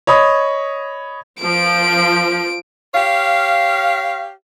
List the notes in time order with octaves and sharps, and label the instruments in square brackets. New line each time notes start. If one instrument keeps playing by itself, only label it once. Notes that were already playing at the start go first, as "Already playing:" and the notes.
[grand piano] C#5 D#5 B5 D#6
[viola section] F3 [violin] D7
[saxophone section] G4 C#5 F5